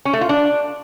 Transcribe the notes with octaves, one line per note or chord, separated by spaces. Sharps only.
C#4
A3
F4
D4